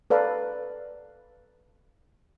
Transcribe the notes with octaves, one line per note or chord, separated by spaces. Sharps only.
A4 B4 D5 F5 A#5